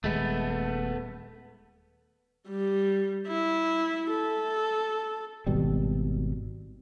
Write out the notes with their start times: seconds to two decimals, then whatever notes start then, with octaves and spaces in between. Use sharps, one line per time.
0.04 D#1 G#3 A3 B3
2.48 G3
3.27 E4
4.11 A4
5.47 G#1 B2 G3